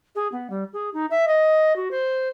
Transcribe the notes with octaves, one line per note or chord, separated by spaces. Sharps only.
G#4
B3
G3
G#4
D#4
E5
D#5
F#4
C5